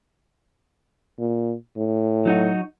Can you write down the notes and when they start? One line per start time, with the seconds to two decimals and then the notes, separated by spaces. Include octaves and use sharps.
1.18 A#2
1.76 A2
2.25 F#3 D#4 F#4